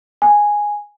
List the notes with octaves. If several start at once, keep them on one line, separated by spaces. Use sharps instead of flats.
G#5